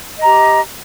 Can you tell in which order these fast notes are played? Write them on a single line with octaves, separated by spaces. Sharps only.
D#5 A#5 G4